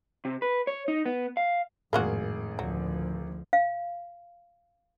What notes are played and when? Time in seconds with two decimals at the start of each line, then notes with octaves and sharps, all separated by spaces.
0.25 C3
0.42 B4
0.67 C#5
0.88 D#4
1.06 B3
1.37 F5
1.93 G#1 F2 A2 A#3 F4 F#4 G#4
2.59 D2 F3 F#3
3.53 F5